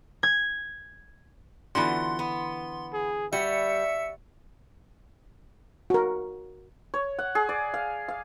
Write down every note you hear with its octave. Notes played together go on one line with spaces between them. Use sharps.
G#6
D3 E3 B3 F4 F#4 C6
B3
G#4
G3 F#4 E5 C#7
F#4 A#4
C#5
F#5
G#4
D5
F5
F5